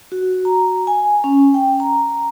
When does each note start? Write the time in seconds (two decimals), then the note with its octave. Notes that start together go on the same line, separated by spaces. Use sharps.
0.12 F#4
0.45 A#5
0.87 G#5
1.24 C#4
1.54 G5
1.80 A#5